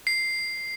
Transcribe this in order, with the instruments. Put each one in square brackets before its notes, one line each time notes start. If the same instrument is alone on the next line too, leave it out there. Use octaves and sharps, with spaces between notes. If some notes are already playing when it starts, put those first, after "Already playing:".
[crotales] C7